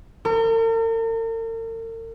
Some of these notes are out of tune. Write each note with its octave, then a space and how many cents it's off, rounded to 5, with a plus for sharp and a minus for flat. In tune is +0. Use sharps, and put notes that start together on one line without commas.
A#4 -45